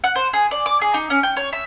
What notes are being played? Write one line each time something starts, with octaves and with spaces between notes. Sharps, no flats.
F#5
C5
G#4
D5
D6
G#4
D#4
C#4
G5
C#5
E5